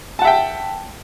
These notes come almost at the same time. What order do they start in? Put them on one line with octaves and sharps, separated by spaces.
A5 F#5 E5 G5